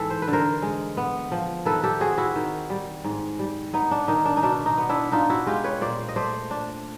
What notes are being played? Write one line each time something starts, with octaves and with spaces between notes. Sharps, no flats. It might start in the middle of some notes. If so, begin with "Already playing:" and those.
Already playing: G#2 E3 A4
C5
B4
D3
A#4 C5
G#3
B3
F3
D#3 A4 B4
G4 A4
C4 F#4 G#4
E4 F#4
D#3
G3
G#2
G3
B3 D#4
D4
D#3 D#4
D4
D#4
B2 D4
D#4
B3
D4 E4
D4 D#4 F4
E4 F#4
G#3 F4 G4
B4 C#5
A#2 C5 D5
D#5
A3 C5 D5
D4